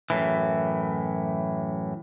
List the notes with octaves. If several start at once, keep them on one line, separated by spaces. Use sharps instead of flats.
F#2 A2 E3